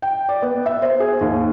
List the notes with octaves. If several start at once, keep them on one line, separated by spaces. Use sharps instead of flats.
G5
D5
B3
E5
C5
G#4
D#2